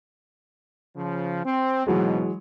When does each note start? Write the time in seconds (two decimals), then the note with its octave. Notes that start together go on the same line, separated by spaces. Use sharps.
0.97 C#3 F3
1.45 C4
1.87 C#2 G#2 B2 E3 F#3 G#3